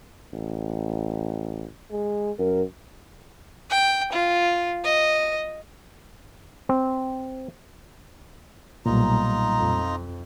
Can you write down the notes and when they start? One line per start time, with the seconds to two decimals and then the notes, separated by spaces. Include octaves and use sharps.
0.33 A1
1.91 G#3
2.39 F#2 A#4
3.70 G5
4.12 F4
4.84 D#5
6.69 C4
8.86 B1 A#2 G3 D#4 F4 A#5
9.58 F2